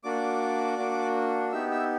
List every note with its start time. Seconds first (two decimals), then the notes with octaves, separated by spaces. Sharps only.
0.04 A#3 D4 F#4 D5 D6
0.78 A#3 D4 F#4
1.52 B3 D#4 G4 E5 E6
1.71 E5 E6